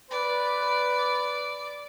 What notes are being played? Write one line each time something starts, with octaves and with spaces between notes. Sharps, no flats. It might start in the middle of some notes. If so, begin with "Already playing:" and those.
B4 D5